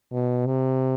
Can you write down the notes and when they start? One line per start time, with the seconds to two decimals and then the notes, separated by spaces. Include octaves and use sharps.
0.12 B2
0.46 C3